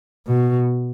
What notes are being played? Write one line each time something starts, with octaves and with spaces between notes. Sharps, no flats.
B2